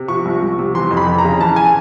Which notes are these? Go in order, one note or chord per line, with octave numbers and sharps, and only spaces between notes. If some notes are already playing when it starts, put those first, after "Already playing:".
Already playing: C3
F3 C#6
C2
C2
C3
E3 C6
F2
B5
F2
A#5
C#3
E3 A5
G#5